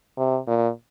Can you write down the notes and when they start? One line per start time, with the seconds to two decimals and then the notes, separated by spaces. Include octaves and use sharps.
0.17 C3
0.47 A#2